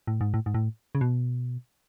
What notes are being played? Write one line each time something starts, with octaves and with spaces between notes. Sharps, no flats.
A2
G#2
A2
G#2
A2
C#3
B2